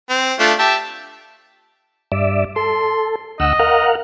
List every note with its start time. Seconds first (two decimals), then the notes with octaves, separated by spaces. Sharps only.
0.10 C4
0.39 A3 D4 F4
0.59 G4 E5 A5
2.12 G2 D5 E5
2.56 A4 C6
3.40 D2 D#5 F#5 E6
3.59 A#4 F5 F#5